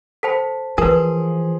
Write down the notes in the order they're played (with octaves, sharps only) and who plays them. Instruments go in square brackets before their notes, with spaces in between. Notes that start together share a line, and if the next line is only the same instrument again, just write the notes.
[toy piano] A4 G5 B5 [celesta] C5 A5 B6
[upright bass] E3 [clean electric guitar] F3 G#4 [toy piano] A#4 B4